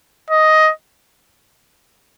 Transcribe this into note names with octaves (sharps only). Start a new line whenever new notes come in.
D#5